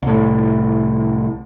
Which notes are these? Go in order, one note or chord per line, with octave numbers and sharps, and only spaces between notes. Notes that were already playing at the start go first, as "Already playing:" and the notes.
C2 A2